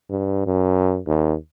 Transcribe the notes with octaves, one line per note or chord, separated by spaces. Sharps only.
G2
F#2
D#2